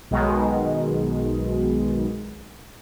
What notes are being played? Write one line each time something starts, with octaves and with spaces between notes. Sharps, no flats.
B1 B2 D#3 G#3